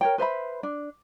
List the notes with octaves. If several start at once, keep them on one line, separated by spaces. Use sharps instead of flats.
A#4 C#5 G5
B4 C5 E5 B5
D4